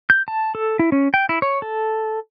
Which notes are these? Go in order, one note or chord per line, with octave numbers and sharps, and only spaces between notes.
G6
A5
A4
E4
C#4
G5
E4
C#5
A4